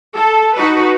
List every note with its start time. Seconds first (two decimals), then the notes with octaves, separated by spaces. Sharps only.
0.14 A4
0.56 D#4 F#4 B4